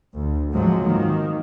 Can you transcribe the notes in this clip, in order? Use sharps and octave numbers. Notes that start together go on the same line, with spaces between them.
D2
G#2 C3 F3 F#3 G#3
D#3 A#3